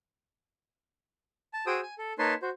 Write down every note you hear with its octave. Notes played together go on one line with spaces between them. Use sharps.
A5
F#4 G#4 C5 G5 D#6 E6
G#5
A4
A#3 D#4 B4 C#5 A5 C6
F#4 C5